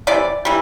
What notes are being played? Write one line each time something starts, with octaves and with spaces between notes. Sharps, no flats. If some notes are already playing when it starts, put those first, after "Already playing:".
C3 E3 D5
E3 G3